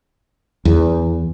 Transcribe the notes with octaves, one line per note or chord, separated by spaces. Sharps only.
E2